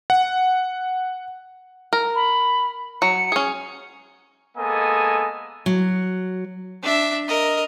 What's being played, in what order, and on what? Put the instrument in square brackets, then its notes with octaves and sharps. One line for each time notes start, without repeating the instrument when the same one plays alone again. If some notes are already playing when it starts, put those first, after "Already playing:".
[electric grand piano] F#5
[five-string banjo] A#4
[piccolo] B5
[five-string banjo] F#3 [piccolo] C#7
[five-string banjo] C#4 G#4
[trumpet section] G#3 A#3 B3 A4 D#5 G#5
[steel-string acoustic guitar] F#3
[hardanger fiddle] D4 E5
A#4 D#5